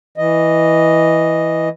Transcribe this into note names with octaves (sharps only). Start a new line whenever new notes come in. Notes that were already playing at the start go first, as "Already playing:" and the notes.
E3 D#5